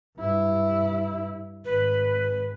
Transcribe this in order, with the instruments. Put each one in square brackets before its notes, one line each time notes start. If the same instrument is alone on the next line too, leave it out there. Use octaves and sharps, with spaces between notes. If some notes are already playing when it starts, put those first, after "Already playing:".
[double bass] G2 E4
[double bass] G#1 [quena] B4